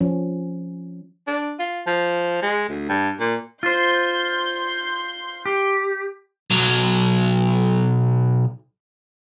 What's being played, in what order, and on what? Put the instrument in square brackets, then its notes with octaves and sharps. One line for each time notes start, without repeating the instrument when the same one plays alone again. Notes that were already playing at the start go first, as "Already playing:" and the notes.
[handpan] F3 C#4
[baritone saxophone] D4
F4
F3
G#3
D2
G2
A#2
[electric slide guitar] F4 C5 [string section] C6 G6
[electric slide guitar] G4
[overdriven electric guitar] B1 F#3